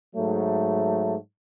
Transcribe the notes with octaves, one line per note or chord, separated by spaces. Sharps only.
G#2 F#3 A3